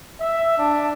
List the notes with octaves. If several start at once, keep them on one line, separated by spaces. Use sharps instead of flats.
E5
D4